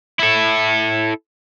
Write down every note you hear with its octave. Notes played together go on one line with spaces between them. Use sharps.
E4 A4